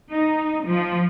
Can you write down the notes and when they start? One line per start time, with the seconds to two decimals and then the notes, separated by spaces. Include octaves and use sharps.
0.12 D#4
0.66 F3